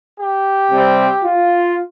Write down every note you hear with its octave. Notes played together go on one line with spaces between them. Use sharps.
G4
C3 G3 C4
F4